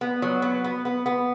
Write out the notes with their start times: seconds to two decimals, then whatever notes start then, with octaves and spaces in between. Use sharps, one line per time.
0.01 B3
0.22 F#3
0.42 B3
0.64 B3
0.85 B3
1.06 B3